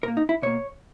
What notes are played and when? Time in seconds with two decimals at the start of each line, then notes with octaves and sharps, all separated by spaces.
0.03 A#2 A#3 A#4
0.17 D#4
0.29 E4
0.42 B2 A#3 C#5